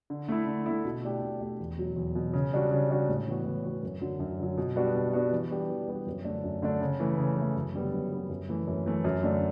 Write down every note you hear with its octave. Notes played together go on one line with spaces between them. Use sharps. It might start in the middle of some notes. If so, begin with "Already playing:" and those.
D3
A3 E4
D3
A3 E4
B2
A3 D4 G4
B2
A3 D4 G4
E2
B2 F#3
E2
B2 F#3
C#3
G3 D4 F#4
C#3
G3 D4 F#4
A2
E3 B3 F#4
A2
E3 B3 F#4
F#2
D3 F#3
F#2
D3 F#3
B2
G3 B3 D4 F#4
B2
G3 B3 D4 F#4
E3
G3 B3 D4 G4
E3
G3 B3 D4 G4
F#2
D3 A3 D4
F#2
D3 A3 D4
C#3
E3 A3
C#3
E3 A3
F#2
D3 G3 B3
F#2
D3 G3 B3
F#2
E3 A3
F#2
E3 A3
F#2
D3 A3 D4